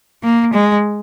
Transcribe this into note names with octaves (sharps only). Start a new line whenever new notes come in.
A#3
G#3